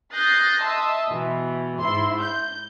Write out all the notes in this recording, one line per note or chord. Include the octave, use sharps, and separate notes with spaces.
D#6 F#6 G6 A6 A#6 C7
D#5 E5 A5 C6 D#6
B2 E3
G#2 E4 C6
G6